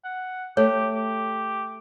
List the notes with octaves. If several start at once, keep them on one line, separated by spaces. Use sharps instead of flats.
F#5
A3 G4 C#5
G4